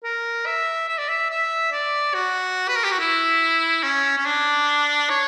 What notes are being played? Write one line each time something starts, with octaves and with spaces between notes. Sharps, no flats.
A#4
E5
E5
D5
E5
E5
D5
F#4
B4
A#4
G4
F#4
E4
C#4
C#4
D4
C#5